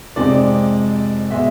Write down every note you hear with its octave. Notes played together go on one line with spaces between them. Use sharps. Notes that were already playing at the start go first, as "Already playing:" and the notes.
F2 C3 G#3 D5
B2 G#3 E5